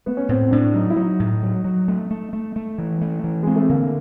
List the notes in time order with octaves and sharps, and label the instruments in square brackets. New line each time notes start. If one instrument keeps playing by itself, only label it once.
[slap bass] A3 [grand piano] B3
[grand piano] C#4
[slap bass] A2 [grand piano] C4
[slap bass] A2 [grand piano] D4
[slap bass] F#3 [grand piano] D#4
[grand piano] E4
[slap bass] F#3 [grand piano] D#4
[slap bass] A2
F#3
F#3
A3
A3
A3
A3
E3
A3
E3
[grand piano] G#3 [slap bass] C4
[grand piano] A3
[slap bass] D3 [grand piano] A#3